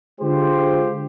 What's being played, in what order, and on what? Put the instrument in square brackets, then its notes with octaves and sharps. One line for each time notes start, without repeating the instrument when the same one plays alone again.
[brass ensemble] D3 G#3 F4 G4 C5